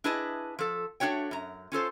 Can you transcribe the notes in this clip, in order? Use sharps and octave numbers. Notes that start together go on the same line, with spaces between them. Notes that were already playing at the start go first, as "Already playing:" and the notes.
D4 E4 G#4 B4 D#5 A5
F3 A4
A3 D4 F#4 C#5 G5
F#2 A#5
C#4 F4 A4 C5